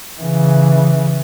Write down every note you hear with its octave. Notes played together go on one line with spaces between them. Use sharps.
C#3 E3